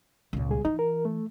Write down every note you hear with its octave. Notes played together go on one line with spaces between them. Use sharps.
C#2 A#2
B2 G3 G#4
E3 D#4
A#4
A3